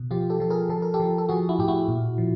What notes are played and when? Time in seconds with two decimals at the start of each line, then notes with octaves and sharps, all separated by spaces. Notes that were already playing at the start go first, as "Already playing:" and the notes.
Already playing: B2
0.11 F3 F4 G4
0.30 G4 A4
0.40 F3 A4
0.50 G#4 A#4
0.69 F3 A4
0.82 A#4
0.94 G4 A4
1.00 F3
1.18 A4
1.29 F3 F#4 G#4
1.49 E4 F#4
1.59 A2 G4
1.68 E4 F#4
1.88 A#2
2.18 F3